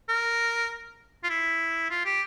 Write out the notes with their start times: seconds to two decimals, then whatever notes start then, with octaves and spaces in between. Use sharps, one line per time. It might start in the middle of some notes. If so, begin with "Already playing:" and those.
0.09 A#4
1.24 F4
1.29 E4
1.90 F4
2.05 G4